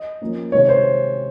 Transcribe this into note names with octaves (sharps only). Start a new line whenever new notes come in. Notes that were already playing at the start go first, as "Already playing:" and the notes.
Already playing: D#5
F3 A#3 C#4
C3 D#3 G#3 C4 C#5
C5